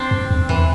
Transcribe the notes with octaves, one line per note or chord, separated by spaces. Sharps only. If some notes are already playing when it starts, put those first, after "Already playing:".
Already playing: C4 D4
F#2
E2
E2 E3